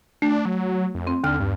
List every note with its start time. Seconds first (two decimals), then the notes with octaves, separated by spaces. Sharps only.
0.22 A3 D4
0.46 F#3
0.95 F2
1.07 C4
1.24 D#2 D3 F6
1.40 G2